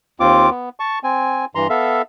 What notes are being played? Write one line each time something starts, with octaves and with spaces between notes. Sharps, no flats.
D#2 C4 F4 D6
B3
A5 C#6
C4 G#5
G2 E3 A#5 C6
B3 A4 E5 F5